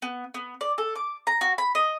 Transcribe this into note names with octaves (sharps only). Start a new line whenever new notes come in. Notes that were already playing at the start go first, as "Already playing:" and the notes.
B3
B3
D5
A4
D6
A#5
F#4
B5
D#5